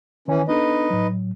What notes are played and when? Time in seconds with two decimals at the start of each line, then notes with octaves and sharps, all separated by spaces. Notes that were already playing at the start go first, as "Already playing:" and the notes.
0.28 D#3 E3 C#4 C#5 G#5
0.48 B3 D4 D#4 A4 B4 D#5
0.91 A2 F#3